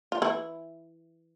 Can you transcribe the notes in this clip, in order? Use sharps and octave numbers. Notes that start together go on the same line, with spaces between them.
F4
E3 E4